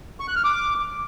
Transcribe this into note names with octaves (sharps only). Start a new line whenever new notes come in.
C#6
F#6
F6
D6